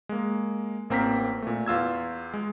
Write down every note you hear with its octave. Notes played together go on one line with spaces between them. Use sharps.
G#3 A#3
A1 A#3 C4 A#5 F6 B6
A#2 A3
E2 F4 E6 G#6
G#3